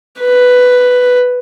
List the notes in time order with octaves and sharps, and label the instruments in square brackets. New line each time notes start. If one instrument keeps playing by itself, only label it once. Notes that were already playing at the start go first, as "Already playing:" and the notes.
[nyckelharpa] B4